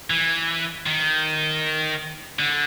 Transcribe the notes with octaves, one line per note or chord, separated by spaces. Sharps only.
E3
D#3
D3